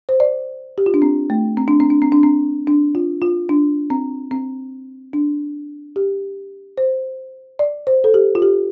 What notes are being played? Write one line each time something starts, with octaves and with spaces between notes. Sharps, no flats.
C5
D5
G4
F4
D4
C4
A3
C4
D4
C4
D4
C4
D4
C4
D4
F4
F4
D4
C4
C4
D4
G4
C5
D5
C5
A4
G4
F4
G4